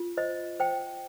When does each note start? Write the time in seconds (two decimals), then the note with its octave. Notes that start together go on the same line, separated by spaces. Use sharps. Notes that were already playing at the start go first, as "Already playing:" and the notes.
Already playing: F4
0.17 C5 D#5
0.60 C5 G5